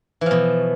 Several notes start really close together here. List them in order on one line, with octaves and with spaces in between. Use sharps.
E3 F3 B2